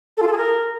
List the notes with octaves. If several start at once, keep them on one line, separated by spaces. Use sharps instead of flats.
A4
F4
A4
G#4
A#4